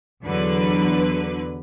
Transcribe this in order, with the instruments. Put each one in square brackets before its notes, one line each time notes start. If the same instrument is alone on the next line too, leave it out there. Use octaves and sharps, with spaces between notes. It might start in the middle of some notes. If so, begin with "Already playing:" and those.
[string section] E2 D3 F#3 B4